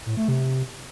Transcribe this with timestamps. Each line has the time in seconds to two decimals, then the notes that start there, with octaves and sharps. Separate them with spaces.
0.06 A2
0.17 A3
0.28 C3